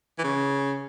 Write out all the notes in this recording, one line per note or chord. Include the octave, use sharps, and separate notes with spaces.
E3
C#3